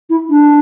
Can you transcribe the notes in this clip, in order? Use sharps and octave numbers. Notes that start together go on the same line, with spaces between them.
E4
D4